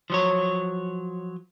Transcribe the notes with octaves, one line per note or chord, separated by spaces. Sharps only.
F3 F#3 C#5